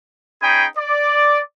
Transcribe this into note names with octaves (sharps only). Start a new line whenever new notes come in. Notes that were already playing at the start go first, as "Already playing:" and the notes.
C#4 D#4 G#4 G5 G#5 B5
D5